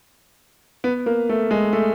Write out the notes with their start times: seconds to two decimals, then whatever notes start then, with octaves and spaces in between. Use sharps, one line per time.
0.84 B3
1.06 A#3
1.29 A3
1.51 G#3
1.73 A3